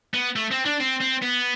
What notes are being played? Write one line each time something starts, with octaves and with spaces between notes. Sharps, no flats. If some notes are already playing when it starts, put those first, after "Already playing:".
B3
A3
C4
D4
C4
C4
B3